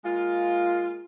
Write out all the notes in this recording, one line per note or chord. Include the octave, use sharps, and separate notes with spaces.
G#3 A#3 F4